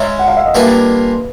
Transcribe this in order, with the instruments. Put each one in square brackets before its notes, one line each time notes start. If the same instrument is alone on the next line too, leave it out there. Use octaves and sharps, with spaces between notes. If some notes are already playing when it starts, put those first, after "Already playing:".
Already playing: [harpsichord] G#3 C#4 E4
[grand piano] F#5
F5
E5
D#5
[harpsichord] G3 A#3 D4 F4 G#4 [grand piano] B4